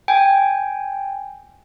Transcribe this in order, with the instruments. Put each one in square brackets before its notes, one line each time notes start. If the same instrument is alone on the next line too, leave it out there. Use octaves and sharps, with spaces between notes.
[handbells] G5 G#5